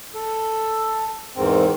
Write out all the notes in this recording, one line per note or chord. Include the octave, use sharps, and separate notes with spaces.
A4
E2 G#2 D#3 C4